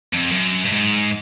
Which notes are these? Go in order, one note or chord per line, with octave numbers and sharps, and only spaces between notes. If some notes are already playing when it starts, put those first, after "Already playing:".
F2
F#2
G2
G#2